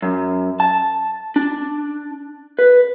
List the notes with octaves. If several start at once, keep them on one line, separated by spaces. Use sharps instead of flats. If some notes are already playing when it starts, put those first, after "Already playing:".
F#2
A5
D4
B4